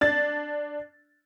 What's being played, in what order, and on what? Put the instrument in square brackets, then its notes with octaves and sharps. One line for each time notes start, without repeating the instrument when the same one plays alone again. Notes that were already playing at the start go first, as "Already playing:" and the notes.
[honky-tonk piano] D4 A6